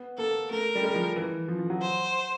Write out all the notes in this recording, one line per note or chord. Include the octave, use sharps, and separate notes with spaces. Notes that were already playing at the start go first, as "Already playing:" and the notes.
Already playing: B3
A#3 A4
A3 A#4
G3
G#3
F3
E3
F3
F3
F#3
C5